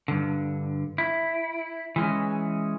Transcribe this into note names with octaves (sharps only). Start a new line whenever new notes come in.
G2 D3
E4
E3 G#3 C#4